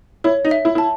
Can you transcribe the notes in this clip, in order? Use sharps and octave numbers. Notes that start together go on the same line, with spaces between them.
E4 C#5
D#4
E5
E4
E4 A5